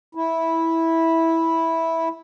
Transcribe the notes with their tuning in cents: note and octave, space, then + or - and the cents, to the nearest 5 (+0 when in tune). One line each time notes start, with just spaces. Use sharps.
E4 -10